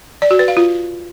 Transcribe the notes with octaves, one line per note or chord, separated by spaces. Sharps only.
D5
F#4
B4
F5
F4